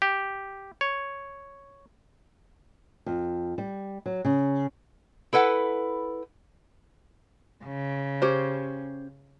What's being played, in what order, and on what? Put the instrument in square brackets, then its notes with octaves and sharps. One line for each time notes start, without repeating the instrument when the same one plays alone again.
[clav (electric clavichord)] G4
C#5
[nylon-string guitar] F2
G3
F#3
C#3
[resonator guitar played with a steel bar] E4 A4 B4 F#5
[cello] C#3
[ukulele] C#4 G4 C5